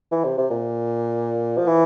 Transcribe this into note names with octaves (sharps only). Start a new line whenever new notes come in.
E3
C3
C3
A#2
F3
E3